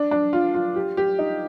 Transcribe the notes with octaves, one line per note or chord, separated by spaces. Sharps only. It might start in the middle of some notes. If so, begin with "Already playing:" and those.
Already playing: D4
D4
F4
F4
G4
G4
D#4